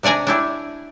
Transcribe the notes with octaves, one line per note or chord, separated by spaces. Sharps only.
C3 D4 D5 G#5 A#5
D4 E4 G4